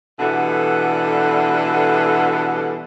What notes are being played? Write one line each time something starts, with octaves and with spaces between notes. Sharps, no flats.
B2 D3 E3 G3 A4 F#5